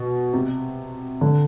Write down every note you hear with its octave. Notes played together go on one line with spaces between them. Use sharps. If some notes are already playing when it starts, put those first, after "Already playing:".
Already playing: B2
C3
D3